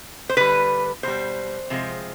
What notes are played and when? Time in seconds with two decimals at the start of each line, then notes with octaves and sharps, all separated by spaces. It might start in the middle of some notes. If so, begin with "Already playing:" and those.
0.29 C5
0.37 D3 G3 B4
1.03 B2 G3 C5
1.70 C3 F3 G#3